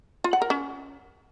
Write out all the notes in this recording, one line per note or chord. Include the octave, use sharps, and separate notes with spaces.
F4
F#5
A#4
C#4